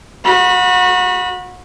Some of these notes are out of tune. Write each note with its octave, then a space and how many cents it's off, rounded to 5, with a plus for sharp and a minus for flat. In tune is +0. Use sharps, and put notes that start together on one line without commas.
F#4 -30 B5 -20